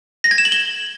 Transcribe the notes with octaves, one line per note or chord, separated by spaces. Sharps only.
A#6
G#6
E7
F#7
G7